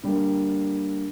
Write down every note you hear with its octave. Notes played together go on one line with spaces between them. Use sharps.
D3 G3 A#3